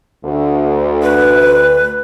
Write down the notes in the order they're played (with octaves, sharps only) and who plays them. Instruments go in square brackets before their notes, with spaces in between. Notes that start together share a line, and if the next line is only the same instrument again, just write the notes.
[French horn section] D2
[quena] B4